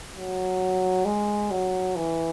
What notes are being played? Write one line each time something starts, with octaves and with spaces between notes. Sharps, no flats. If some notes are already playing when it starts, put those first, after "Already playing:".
F#3
G#3
F#3
E3